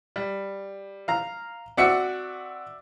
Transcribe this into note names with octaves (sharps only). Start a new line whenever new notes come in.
G3
F5 A#5
C4 F#4 D5 E5 C#7